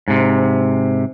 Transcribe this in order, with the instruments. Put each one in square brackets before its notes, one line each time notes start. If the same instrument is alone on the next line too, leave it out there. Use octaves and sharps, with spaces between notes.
[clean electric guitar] G#2 C3